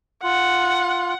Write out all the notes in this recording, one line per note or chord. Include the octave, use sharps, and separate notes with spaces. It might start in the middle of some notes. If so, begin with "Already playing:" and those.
F4 F#5